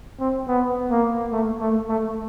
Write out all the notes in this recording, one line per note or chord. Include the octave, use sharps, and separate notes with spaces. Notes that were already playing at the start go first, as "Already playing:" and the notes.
C4
B3
A#3
A3
A3
A3